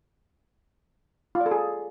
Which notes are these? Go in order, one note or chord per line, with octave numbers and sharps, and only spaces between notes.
F4
D5
A4
G#4